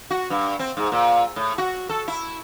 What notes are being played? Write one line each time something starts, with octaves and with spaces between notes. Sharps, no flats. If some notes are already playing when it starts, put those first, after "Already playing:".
F#4
G2
C4
G#2
A#2
A2
F#4
A4
E4